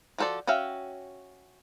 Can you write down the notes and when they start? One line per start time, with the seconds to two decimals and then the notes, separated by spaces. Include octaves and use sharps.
0.18 F3 F#4 A4 C5 D5
0.47 C#4 F#4 E5 F5 G5